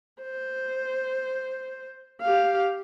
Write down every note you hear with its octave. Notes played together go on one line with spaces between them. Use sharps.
C5
G4 F5